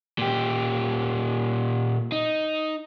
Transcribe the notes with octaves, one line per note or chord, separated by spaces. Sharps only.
A#2 G4
D#4